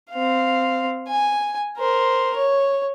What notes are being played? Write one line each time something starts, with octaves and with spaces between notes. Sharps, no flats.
C4 F5
G#5
A#4 C5
C#5